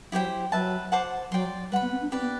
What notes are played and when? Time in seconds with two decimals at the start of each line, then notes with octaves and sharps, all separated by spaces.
0.12 F#3 E4 G4 C5 G5
0.52 F#3 B4 E5 A5
0.92 C5 F#5 A5 D6
1.32 F#3 D5 G5 C6
1.71 G3 B4 F#5 B5
1.82 B3
1.92 C4
2.01 D4
2.12 C4 G4 B4 D5
2.21 B3